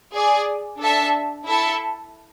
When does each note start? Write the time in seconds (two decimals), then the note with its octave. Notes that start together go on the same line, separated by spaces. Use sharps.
0.15 G#4 D5 G#5
0.80 D4 A4 E5 A5
1.46 E4 A4 E5 A5